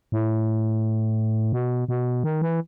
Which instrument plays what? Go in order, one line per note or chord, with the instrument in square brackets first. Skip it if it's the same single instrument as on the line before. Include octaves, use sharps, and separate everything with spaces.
[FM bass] A2
B2
B2
D#3
E3